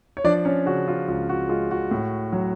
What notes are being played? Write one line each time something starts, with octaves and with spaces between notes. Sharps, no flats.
C#5
F3 D4 D5
C#4 C#5
C#3 F#4
F4
C#2 F4
F#4
G#3 F4
F#4
A2
F#3